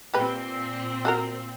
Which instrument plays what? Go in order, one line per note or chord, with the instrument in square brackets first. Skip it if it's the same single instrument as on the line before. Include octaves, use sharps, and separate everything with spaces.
[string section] A#2 C4 [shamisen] G4 B4
[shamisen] F#4 A4 A#4